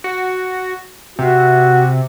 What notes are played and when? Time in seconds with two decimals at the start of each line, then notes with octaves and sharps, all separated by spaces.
0.04 F#4
1.19 C3 F#4